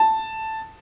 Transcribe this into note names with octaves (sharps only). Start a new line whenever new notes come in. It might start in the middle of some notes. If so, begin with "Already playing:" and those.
Already playing: A5